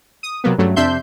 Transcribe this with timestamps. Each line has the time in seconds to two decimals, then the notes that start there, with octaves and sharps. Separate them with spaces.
0.23 D#6
0.44 C3 F#3 A#3 B3
0.58 G2 C#3 F#3 A3
0.76 F2 C3 D4 E5 C6 G6